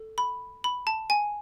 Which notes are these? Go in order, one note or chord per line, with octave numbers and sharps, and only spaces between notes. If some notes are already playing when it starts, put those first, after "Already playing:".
Already playing: A4
B5
B5
A5
G#5